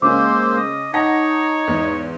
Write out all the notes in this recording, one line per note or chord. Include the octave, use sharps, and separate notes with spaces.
C#3 G#3 A#3 C#4 C5 D6 E6
D#5
D#4 C#5 F#5 A5 A#6
E2 G#2